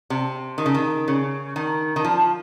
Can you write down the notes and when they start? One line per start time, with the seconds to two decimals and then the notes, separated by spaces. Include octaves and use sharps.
0.10 C3
0.58 D#3
0.66 C#3
0.75 D#3
1.08 C#3
1.56 D#3
1.96 D#3
2.05 F3